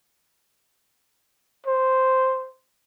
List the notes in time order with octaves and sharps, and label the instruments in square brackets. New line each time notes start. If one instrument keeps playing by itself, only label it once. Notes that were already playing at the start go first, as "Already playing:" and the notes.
[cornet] C5